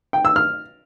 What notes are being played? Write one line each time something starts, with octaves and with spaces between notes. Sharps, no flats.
G5
E6
F6